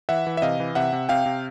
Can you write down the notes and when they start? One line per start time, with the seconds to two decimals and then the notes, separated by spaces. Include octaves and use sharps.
0.09 E3 E5 F#5
0.27 E3
0.37 E5
0.42 C3 D#5 F5
0.60 E3
0.75 C3 E5 F#5
0.93 C3
1.09 C3 F5 G5
1.26 C3